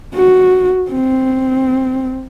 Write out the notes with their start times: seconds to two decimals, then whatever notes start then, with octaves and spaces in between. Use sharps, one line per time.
0.14 F#4
0.91 C4